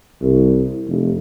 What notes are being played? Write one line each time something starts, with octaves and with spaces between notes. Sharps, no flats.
C2
F1